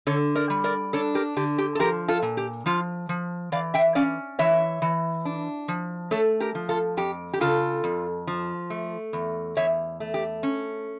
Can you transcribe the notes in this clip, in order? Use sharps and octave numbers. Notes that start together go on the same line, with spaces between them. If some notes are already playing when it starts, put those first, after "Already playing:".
D3 A4 C#5
A#4 D5
G3
A#4 D5
D4 A4 C#5
G4 A#4
D3 G4
G4
A4
F3 G4 A#4
F4 A4
A#2
G4
F3 F4
F3
E3 D5 F5
E5 G5
C#4 D5 F5
E3 C#5 E5
E3
D4
F3
A3 A4 C#5
G4 A#4
F3
F4 A4
F2 G4
G4
C#3 F4 A4
F2
F3
A3
E2
E2 C#5 E5
A3
G4
C#4